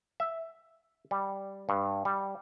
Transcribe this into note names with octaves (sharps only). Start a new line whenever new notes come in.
E5
G3
G2
G3